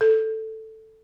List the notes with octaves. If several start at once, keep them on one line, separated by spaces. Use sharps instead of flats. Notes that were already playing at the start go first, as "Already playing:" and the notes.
A4